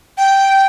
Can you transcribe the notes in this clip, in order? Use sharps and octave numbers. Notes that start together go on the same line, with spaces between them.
G5